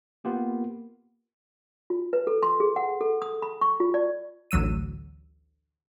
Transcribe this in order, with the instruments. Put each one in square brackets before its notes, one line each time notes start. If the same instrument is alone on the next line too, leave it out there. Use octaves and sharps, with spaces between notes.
[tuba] A#3 [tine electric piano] B3 F4 G4
[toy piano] F4
B4
A4
C6
G#4
F#5
A4
D#6
B5
C#6
F4
D5
[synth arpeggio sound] A1 D2 F#3 E6 D#7